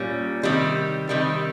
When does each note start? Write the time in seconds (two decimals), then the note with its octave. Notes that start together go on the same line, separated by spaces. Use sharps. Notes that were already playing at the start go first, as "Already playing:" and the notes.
Already playing: A#2 G3 C#4
0.43 C3 D#3 G3
1.09 C3 D#3 G3